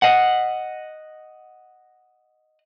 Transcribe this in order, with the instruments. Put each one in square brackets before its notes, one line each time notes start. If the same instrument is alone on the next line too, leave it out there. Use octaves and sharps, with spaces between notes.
[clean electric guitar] D#5 F#5